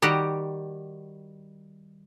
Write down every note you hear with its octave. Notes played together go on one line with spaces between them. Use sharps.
D#3 G3 F#4 G4 F#5